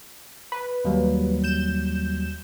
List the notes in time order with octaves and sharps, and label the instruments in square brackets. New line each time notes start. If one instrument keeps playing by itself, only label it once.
[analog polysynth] B4
[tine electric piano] D#2 F#3 G3
[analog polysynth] G6 E7